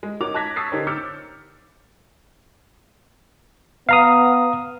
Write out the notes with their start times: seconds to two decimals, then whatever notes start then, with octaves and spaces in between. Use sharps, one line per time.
0.03 G#3
0.20 D#4 F#4 A#4 C#5 D6 F7
0.34 A5 D6 F#6 G#6 A#6 B6
0.56 C#6 D#6 E6 A6 B6 C7
0.72 D3 D#4 G4 A#4 C5 C#5
0.87 D6 E6 F6 G6 A6 C#7
3.89 B3 F5 A#5 D#6